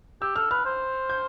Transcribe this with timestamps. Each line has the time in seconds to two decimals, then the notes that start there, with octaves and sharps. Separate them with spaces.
0.21 G4 E6
0.36 A4 F6
0.51 B4 F6
0.66 C5
1.10 G6